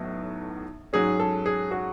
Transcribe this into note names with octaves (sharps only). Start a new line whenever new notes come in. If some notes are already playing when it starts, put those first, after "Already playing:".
Already playing: B1 A2 F#3 B3
G#2 F#3 C#4 G#4
A4
G#4
F#4